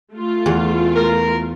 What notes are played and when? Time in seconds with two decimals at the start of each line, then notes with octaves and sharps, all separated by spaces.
0.14 A3 F4
0.46 E2
0.96 A#4